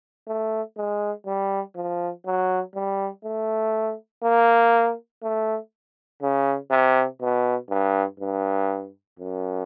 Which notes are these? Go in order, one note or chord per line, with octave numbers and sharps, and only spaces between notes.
A3
G#3
G3
F3
F#3
G3
A3
A#3
A3
C#3
C3
B2
G2
G2
F#2